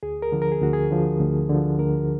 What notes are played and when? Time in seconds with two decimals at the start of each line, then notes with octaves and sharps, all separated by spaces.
0.03 D2 G#4
0.22 A#4
0.32 D3 F3
0.42 A#4
0.52 G#4
0.62 D2 F#4
0.73 G#4
0.91 D3 F3
1.20 D2
1.50 D3 F3
1.79 D2 A#4